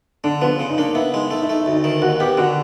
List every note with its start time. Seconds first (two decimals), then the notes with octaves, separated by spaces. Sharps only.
0.24 D3 D4
0.42 F3 B3
0.59 C#3
0.70 D#4
0.78 A#3 D4
0.95 B3 E4
1.13 G#3 D#4
1.23 E4
1.31 A3 D#4
1.42 E4
1.49 A3 D#4
1.62 D2 E4
1.72 D#4
1.84 D#3
2.02 D#2 F#4
2.20 B3 G4
2.37 D3 F#4